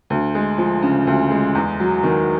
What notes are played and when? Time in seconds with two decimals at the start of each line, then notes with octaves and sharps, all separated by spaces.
0.10 D2
0.35 G#3
0.58 F3
0.82 C#3
1.07 D2
1.31 G#3
1.55 E2
1.80 F#3
2.03 D#3